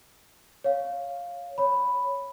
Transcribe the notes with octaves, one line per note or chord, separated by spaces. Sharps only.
C#5 F5
C#5 B5